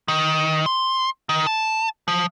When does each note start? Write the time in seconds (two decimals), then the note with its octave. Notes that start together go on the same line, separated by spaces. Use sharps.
0.08 D#3
0.66 C6
1.29 D#3
1.47 A5
2.08 F3